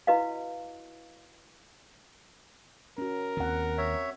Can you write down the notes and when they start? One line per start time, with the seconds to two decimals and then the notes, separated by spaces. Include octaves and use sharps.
0.07 E4 F#4 B4 D#5 F5
2.98 C#4 F#4 A#4
3.37 D#2 D#3 C4 F#5
3.78 C#5 E5